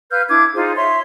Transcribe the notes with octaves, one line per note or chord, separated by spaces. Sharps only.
B4 F5 F6 G6
D4 E4 D6 G#6
D#4 F4 G#4 C5
C#5 E5 C6